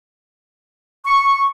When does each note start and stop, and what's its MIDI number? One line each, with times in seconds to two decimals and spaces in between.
1.05 1.46 85